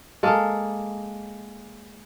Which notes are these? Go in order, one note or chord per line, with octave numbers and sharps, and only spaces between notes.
G#3 A#3 A4